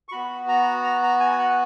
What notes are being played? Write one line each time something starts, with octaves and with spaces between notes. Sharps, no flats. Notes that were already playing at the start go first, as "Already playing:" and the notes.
C#6
B3 F#4 B5
A#5
A#5
A#5
G#5
F#5